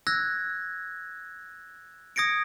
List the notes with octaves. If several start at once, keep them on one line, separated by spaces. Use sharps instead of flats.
E6 F#6 G#6 A#6
D#6 G#6 A#6 C#7 D7